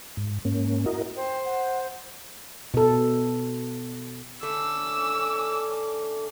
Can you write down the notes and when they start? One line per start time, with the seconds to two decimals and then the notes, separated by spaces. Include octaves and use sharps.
0.17 G#2
0.45 G#2 A#3 C#4
0.86 E4 F#4 A#4 D#5
1.17 C5 G5
1.45 F#5
2.74 B2 A4
4.43 D3 A3 C#4 D6 E6